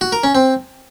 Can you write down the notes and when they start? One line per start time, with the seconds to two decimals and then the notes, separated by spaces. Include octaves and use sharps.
0.01 F#4
0.12 A#4
0.24 C#4
0.35 C4